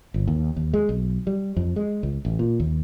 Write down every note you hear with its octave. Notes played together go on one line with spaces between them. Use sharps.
G1
D#2
D#2
G#3
B1
G3
F2
G#3
C#2
A1
A#2
D#2